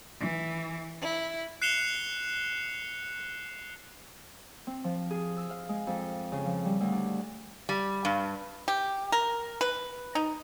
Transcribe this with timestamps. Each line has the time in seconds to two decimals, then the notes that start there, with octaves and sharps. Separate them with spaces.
0.20 E3
1.01 E4
1.62 F#6 C7 C#7 E7 F7 G7
4.67 C4
4.84 F3
5.11 G#4
5.37 E6
5.50 F5
5.69 G#3
5.87 F2
6.32 C#3
6.46 F3
6.65 G3
6.80 D2
6.92 D4
7.69 G3
8.05 G2
8.68 G4
9.12 A#4
9.61 B4
10.15 D#4